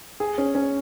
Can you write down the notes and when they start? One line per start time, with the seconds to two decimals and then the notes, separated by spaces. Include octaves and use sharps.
0.20 G#4
0.38 C#4
0.55 C#4